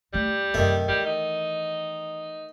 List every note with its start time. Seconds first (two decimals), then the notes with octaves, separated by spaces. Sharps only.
0.13 C2 G3 A3
0.54 F#2 C3 D#3 A3
0.88 E3 G3
1.05 D#4